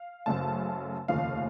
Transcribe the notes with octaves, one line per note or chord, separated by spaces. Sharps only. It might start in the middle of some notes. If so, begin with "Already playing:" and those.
Already playing: F5
F#1 F#2 C#3 A3 A5
F1 D#2 C#3 F3 A3 F5